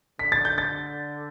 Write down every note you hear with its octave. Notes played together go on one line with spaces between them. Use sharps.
D3 B6
A6
G6
A6